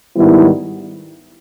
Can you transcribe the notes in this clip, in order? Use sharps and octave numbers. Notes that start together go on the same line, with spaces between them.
G#2 D#3 G3 B3 E4